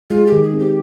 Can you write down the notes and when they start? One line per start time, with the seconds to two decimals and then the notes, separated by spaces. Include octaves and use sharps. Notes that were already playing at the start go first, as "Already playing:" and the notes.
0.10 G#3 F4
0.27 G4
0.32 D#3
0.43 G#4
0.54 C4
0.59 G4